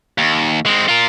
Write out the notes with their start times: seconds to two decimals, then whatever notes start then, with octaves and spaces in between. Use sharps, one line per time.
0.18 D#2
0.66 G#3 C4
0.88 F4 A#4